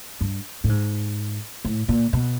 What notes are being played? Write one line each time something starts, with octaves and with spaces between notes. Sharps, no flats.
G2
A2
G#2
A2
A#2
B2